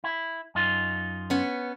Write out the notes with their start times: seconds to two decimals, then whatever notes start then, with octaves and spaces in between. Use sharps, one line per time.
0.04 E4
0.55 F#2 D#4 F4
1.30 B3 C#4